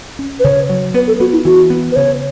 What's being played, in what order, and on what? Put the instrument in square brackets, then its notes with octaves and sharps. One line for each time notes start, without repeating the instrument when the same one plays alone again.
[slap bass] C#4
[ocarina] B4
[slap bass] C#3 [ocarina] C#5
[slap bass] F#3
[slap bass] B3 [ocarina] B4
[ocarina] A4
[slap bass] B3 [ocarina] F#4
[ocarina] E4
[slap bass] E3 [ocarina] F#4
[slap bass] B3
[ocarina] B4
[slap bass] C#3 [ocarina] C#5